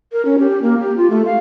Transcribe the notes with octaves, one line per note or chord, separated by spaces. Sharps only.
A#4
C#4
G4
A#3
G4
F4
A3
F5